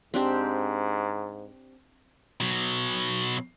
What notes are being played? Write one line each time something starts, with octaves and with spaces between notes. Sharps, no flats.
G#2 C4 D4 G4
B2 F#3